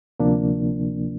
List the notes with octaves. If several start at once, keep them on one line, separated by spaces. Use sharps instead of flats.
D2 C3 F3 A#3 D4